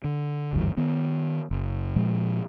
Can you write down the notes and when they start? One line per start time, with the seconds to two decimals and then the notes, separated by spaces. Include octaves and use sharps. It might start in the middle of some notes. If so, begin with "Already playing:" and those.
0.04 D3
0.53 F#1 D2 G2 E3
0.77 D#3 B3
1.51 F#1
1.96 A#2 F3 G#3